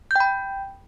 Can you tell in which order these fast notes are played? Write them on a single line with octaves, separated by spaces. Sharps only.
G6 G5 B5